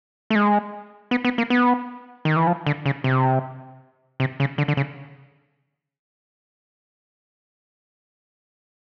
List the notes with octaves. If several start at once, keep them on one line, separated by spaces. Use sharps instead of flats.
A3
G#3
B3
B3
A#3
B3
D#3
E3
F3
D3
C#3
C3
C3
C#3
D3
D3
C#3